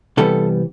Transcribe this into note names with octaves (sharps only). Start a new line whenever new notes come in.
C3 E3 G3 B3 A4